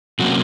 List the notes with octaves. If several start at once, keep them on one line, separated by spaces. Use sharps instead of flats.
C3 F#3 A#3 C#4 F#4